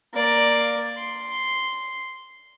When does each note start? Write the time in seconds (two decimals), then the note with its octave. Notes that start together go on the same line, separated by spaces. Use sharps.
0.13 A#3 D5
0.98 C6